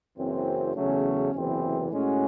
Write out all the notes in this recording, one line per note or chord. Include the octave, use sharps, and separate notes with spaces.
F#1 F#2 E3 C4
E2 C#3 F#3 A3 C#4
F#1 E2 C3 E3 C4
A2 G#3 C#4 F#4